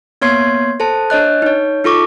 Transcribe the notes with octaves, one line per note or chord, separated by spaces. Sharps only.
A#3 B3 C#5 C6 G#6 C7
A4 C5 A5
D4 C#5 D#5 F#6
D#4 C#5
D#4 F4 A4 C#6 D6